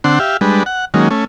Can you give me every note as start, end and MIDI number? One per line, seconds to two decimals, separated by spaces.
0.04 0.19 50
0.04 0.19 60
0.04 0.19 62
0.04 0.19 78
0.04 0.19 84
0.20 0.37 67
0.20 0.37 76
0.20 0.37 77
0.41 0.63 55
0.41 0.63 56
0.41 0.63 62
0.41 0.63 71
0.66 0.85 78
0.94 1.09 51
0.94 1.09 54
0.94 1.09 56
0.94 1.09 58
0.94 1.09 61
1.11 1.25 57
1.11 1.25 61